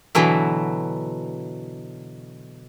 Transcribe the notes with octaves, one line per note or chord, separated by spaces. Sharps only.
B2 D3 E3 F#3 E4